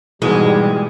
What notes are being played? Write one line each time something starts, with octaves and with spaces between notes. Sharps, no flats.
G#2 B2 E3 G3 G#3